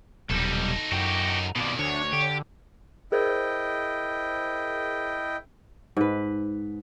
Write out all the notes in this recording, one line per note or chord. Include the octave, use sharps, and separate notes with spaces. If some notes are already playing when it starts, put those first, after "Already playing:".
D#1 B1 G3 D#4 A4
F#2 F#4 G4
F2 B2 D#3 D5
D2 D4 C#5
D3 G4
E4 G#4 A#4 C5 D#5 G5
G#2 B4